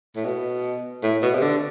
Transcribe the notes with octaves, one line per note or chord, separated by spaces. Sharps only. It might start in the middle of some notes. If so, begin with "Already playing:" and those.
A2
B2
A2
B2
C3
D3